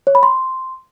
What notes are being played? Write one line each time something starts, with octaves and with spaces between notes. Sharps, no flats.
C#5
B5
C6